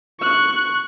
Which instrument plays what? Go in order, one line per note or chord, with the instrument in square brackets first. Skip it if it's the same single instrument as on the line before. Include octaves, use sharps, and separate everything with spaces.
[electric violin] C#6 F#6